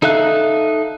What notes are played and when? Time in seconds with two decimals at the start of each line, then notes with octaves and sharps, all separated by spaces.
0.02 D#4 A4 E5 F5 F#6